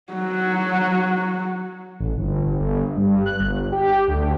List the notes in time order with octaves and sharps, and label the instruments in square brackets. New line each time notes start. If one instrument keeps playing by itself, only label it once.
[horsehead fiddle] F#3 F#4
[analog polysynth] A1
G1
G1
G2
F#6
G1
G4
D2